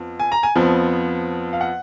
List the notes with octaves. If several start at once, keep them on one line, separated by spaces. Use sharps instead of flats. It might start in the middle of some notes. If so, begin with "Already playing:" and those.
Already playing: F2 F3 B3
G#5
A#5
G#5
F2 F3 B3
F5
F#5